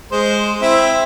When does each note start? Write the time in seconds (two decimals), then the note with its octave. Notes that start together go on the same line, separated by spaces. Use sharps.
0.12 G#3 C5
0.62 C4 E4 E5